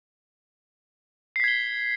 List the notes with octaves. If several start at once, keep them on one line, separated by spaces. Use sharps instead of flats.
G#6 B6 C7 G7